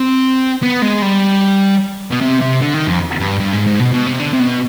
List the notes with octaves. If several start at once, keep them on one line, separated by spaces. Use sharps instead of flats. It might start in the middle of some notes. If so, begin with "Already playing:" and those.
Already playing: C4
B3
G#3
G3
B2
C3
C3
D3
D#3
F2
G2
G2
G#2
G#2
B2
B2
C3
D3
C3
B2